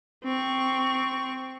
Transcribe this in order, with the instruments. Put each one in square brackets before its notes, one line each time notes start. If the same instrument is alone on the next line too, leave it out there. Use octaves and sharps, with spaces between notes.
[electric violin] C4 C#6